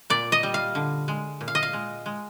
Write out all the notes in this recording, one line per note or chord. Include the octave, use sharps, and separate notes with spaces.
A#2 D5
D#5
G3
F5
D3
G#3
A#2
F5
D#5
F5
G#3
G#3